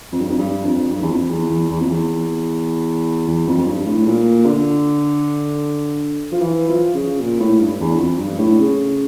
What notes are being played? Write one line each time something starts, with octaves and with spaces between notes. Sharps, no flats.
F2
G2
F2
G2
F2
G2
E2
F2
E2
E2
E2
F2
E2
E2
F2
F2
G2
A2
A#2
D3
F3
E3
F3
C#3
A#2
A2
G2
E2
F2
G2
A2
C#3